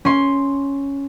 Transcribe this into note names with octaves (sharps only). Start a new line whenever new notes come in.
C#4 C6